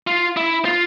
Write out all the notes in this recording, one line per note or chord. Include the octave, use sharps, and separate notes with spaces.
F4
E4
F4